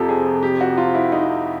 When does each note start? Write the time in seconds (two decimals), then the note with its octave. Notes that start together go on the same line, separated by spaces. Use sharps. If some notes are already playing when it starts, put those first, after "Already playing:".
Already playing: F2 C3 F3 G4 A4
0.09 G#4
0.43 G4
0.61 F#4
0.78 F4
0.94 E4
1.12 D#4